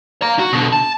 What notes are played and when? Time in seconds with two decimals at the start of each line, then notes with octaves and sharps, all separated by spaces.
0.22 F5 A#5
0.39 F#4
0.53 B2 D3
0.73 A5